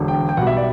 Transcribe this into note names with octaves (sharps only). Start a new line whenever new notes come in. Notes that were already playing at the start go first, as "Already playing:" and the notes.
Already playing: E1 D3
G5
G5
B1 B2 G3 F#5
E5
D5